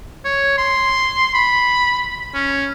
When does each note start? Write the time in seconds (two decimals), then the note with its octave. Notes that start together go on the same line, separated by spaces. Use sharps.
0.25 C#5
0.58 C6
1.34 B5
2.34 C#4